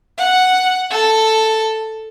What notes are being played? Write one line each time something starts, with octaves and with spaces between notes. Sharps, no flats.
F#5
A4